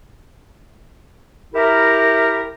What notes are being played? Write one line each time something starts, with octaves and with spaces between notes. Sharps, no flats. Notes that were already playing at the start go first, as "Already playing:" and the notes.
E4 G4 A#4